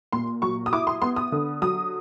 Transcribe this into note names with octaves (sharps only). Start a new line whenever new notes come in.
A#2 C6
F#3 C#6
D#6
E4 D6
C6
B3 C6
D#6
D3
F#3 D#6